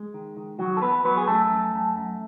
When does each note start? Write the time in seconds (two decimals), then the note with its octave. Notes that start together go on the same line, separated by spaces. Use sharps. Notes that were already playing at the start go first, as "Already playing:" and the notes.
Already playing: G#3
0.14 D#3
0.37 D#3
0.59 D#3 F#3 F#4
0.77 A4
0.81 E2 B3 B4
1.05 F#3 B3 B4
1.18 G#4
1.27 F#2 A3 A4
1.50 F#2
1.73 F#2
1.96 F#2